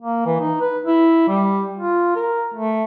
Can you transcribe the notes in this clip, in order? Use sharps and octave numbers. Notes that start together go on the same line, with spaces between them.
A#3
E3
D#4
B4
E4
G3
F4
A#4
A3